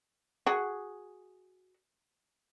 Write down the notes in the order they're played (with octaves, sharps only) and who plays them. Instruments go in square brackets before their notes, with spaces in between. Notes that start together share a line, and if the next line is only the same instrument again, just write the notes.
[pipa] F#4 G#4